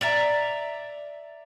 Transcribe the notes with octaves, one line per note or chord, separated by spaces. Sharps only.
D5 E5 A#5